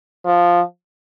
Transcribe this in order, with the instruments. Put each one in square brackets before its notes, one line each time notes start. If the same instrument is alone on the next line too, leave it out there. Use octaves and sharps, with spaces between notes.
[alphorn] F3